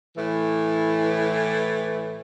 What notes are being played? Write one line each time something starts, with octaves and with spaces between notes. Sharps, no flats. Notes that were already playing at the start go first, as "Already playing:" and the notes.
A2 E3